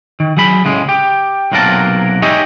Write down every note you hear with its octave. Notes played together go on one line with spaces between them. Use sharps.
D#3
F#3 G#4 B5
A2 C#3 G#3 G#4
G4
B1 C3 F#3 A#3 A#4 A5
D#4 G4 G#4 C#5 D#5 E5